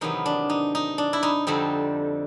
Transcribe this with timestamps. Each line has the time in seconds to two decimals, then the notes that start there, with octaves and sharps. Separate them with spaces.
0.01 E2 C3 D#3 F#3 B3 D#4
0.26 D4
0.50 D#4
0.75 D#4
0.98 D4
1.13 E4
1.23 D#4
1.47 F2 D3 G3 C4 D#4